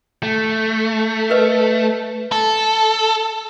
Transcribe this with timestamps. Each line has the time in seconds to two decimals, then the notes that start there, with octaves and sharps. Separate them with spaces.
0.23 A3
1.30 A#4 B4 D#5
2.32 A4